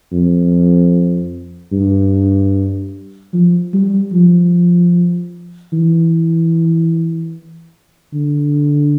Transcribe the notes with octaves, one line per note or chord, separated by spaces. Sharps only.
F2
G2
F3
G3
F3
E3
D3